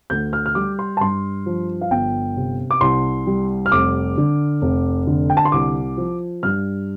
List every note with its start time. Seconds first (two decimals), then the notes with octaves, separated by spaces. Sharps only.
0.10 D2 G6
0.33 F6
0.46 F6
0.55 G3 D6
0.79 C6
0.97 A5
1.01 G2 C6
1.46 F3
1.81 F5
1.91 G1 G5
2.37 C3
2.71 D6
2.81 C2 C6
3.27 G3
3.66 F6
3.72 F1 D6
4.18 D3
4.62 F1
5.07 D3
5.30 G5
5.37 A5
5.45 C6
5.52 C2 D6
5.97 F3
6.43 G2 F6